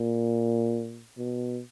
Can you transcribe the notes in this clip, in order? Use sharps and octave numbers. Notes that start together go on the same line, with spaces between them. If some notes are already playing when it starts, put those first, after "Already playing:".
Already playing: A#2
B2